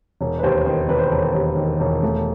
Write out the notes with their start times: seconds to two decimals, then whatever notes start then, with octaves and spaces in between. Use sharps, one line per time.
0.21 E1
0.39 B4
0.43 D#2 C5
0.65 D#3 C5
0.89 E1 B4
0.98 C5
1.07 B4
1.12 E1
1.35 D#2
1.56 D#3
1.80 E1
2.03 A3